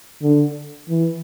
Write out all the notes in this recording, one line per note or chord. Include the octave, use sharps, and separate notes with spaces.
D3
E3